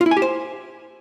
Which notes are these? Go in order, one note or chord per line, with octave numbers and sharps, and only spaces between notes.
F4
E4
G#5
G4
C5